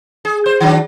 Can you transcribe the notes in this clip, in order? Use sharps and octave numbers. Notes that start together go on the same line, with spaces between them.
G#4
C5
D#3 F#3 D4